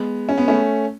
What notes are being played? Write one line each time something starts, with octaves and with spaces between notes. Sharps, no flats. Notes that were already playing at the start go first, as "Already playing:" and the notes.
Already playing: G#3 B3
C#4
B3
A3 C#4